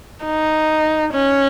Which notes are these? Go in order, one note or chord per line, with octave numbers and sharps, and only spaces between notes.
D#4
C#4